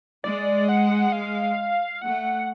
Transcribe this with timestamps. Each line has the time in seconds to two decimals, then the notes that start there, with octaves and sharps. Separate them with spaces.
0.24 G#3 D5
0.69 F#5
1.12 F5
2.02 A3 F#5